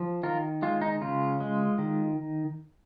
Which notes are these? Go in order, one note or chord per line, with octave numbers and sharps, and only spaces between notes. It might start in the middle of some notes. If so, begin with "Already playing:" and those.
Already playing: F3
D#3 F4 A#4
G#3 F4
D#4
C#3 F4
G#3
D#3